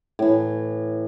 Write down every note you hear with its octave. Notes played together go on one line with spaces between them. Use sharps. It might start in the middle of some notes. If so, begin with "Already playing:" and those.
A2 E3